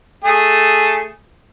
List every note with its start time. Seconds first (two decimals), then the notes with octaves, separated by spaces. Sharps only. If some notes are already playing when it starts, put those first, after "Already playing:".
0.24 A3 G#4